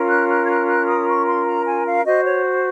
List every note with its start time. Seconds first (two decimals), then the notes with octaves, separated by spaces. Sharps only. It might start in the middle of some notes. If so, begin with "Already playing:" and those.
Already playing: C#4 F4 A#4
0.09 F#6
0.29 F#6
0.44 G#6
0.49 F#6
0.69 F#6
0.88 D#6
1.08 C#6
1.27 C6
1.46 A#5
1.65 G#5
1.85 F5
2.05 F#4 C5 D#5
2.25 C#5